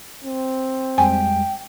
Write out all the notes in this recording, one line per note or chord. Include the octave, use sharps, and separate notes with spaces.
C4
F2 G3 G#3 G5 G#5